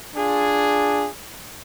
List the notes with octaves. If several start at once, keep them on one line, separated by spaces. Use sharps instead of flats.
D4 F4 G#4